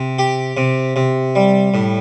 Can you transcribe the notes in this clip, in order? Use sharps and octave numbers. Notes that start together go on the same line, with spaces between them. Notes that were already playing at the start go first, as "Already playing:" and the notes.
Already playing: C3
G4
C3
C3
G3
A2